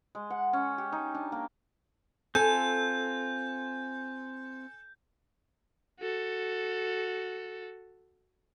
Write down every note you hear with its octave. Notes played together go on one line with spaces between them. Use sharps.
G#3
F#5
C#4
G4
D#4
D4
A#3
C4 F4 A4 G#5 G6
F#4 A4